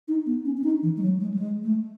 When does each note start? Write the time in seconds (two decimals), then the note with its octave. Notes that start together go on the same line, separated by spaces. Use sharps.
0.08 D#4
0.26 B3
0.45 C#4
0.57 C#4
0.64 D#4
0.83 E3
0.97 G#3
1.02 F#3
1.20 G#3
1.34 F#3
1.39 G#3
1.64 A3